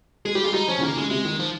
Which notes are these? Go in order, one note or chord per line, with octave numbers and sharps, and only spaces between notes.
G#3 G#4
G3 G4
G#3 F4
G3 D#4
F3 C#4
C#3
D#3 A#3
C#3 G#3
C3 G#3
D#3
F3